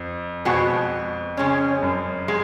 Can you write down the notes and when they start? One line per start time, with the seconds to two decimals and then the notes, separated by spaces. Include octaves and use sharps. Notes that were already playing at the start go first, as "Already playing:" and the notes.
Already playing: F2
0.45 F2 B2 G#3 B3 F#4
1.37 C#3 G#3 C#4
1.82 F#2
2.28 G#3